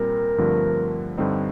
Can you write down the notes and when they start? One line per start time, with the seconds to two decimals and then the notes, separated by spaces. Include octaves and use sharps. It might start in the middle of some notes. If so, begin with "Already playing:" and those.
Already playing: A#2 G3 C4 A#4
0.38 G2 D3 F3 A3 C4
1.18 G2 D3 G3 C4 D#4